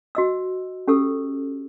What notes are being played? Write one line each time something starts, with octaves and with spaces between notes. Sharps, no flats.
F#4 D#5 E6
C#4 G4 A4 E6